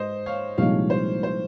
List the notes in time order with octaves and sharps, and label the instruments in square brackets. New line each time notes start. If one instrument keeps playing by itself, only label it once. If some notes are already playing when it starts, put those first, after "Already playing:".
Already playing: [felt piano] G#2 [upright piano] C5 D#5
[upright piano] C#5 F5
[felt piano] C2 A#2 F3 G#3 D#4 [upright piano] C#5 F5
[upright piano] C5
C5